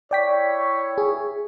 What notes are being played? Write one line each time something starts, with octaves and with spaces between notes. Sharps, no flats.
E4 C#5 D5 G5 B6
G#4